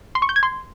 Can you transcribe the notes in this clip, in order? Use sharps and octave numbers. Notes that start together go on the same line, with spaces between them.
C6
C#6
G6
G#6
C6